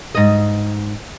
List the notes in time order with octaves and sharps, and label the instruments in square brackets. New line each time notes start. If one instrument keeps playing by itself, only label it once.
[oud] G#2 D#5